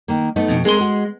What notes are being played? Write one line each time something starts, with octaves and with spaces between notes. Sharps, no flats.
D#3 A#3
A3 B3 D#4
F2 B2
G#3 C4 G#4 A#4 C6
F#4